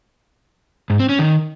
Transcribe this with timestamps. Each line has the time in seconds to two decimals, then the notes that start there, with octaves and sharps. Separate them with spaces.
0.90 G#2
1.00 C4
1.09 C#4
1.19 D#3